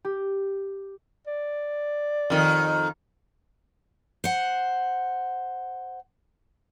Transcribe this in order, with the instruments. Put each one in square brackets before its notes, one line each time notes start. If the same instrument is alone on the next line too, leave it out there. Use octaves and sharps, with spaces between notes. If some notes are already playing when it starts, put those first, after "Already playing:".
[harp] G4
[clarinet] D5
[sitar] F2 D#3
[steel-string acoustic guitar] C5 F#5